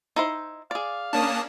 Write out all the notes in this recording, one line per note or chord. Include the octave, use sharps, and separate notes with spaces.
D#4 E4 C5
G#4 D5 F5
A#3 C#4 D4 A5 D#6